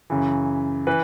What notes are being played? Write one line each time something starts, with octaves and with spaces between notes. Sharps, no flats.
F#2 C#3 E3
E3 B4